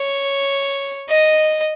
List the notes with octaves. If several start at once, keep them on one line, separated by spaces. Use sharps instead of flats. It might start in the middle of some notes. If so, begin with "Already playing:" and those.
Already playing: C#5
D#5